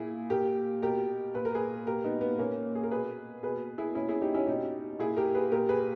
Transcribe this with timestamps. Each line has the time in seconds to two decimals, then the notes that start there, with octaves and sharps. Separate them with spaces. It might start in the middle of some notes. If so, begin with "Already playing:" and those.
Already playing: A#2 E4 G#4
0.30 A#2 G4 A#4
0.82 B2 G4 A#4
1.34 A#2 B4
1.45 A#4
1.55 G#4 B4
1.87 A#2 G4 A#4
2.04 B3 D#4
2.21 B3
2.39 A#2 A#3 C#4
2.75 G#4
2.83 A#4
2.91 B2 G#4 B4
3.43 B2 G#4 B4
3.78 E4 G#4
3.95 B2 C#4 E4
4.09 E4 G#4
4.22 D#4 G4
4.34 C#4 E4
4.47 B2 D#4 G4
4.99 A#2 E4 G#4
5.17 G4 A#4
5.35 G#4 B4
5.52 A#2 G4 A#4
5.69 G#4 B4